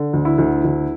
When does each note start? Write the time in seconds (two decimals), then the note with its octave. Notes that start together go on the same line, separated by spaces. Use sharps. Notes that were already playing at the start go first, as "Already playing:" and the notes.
Already playing: D3
0.13 D2
0.25 E4
0.38 D2
0.64 D2